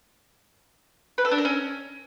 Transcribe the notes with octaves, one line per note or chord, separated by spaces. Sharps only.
B4
A4
D4
A#4
C#4